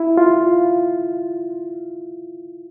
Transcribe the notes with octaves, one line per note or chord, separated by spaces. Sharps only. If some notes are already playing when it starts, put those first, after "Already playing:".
Already playing: E4
F4